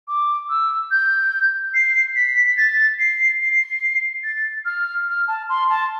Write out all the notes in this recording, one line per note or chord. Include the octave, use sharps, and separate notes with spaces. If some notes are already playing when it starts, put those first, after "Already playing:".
D6
E6
G6
C7
B6
B6
A6
C7
C7
A6
F6
F6
A5
C6
A5